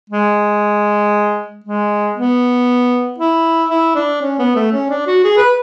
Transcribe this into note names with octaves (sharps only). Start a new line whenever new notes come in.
G#3
G#3
B3
E4
E4
D4
C#4
B3
A3
C#4
D4
F#4
G#4
B4